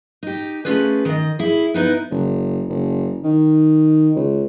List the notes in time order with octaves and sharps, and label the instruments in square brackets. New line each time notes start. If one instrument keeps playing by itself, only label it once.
[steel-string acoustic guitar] D#4 G4
A3 A#3 C#4 F4 G#4 B4
D#3 D#5
E4 G#4
B3 D#4 E4 B4
[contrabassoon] F#1
F#1
D#3
C#2